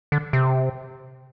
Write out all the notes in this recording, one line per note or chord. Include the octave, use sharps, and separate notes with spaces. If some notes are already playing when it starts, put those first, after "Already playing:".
D3
C3